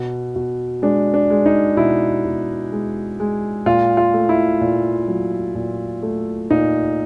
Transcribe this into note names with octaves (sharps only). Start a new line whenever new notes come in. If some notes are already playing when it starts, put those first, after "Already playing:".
Already playing: B2
B2
G#3 D4
D4
G#3
D#4
B2 E4
B2
G#3
G#3
A#2 F4
F4
A3
E4
A#2
F#3
A#2
A3
A#2 D#4